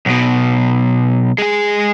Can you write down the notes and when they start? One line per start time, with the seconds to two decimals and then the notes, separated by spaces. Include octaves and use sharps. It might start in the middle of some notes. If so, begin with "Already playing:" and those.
0.06 B1 B2
1.38 G#3 G#4